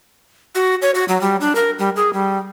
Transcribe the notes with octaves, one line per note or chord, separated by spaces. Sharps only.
F#4
C#5
F#4
F#3
G3
D4
A#4
G3
G#4
G3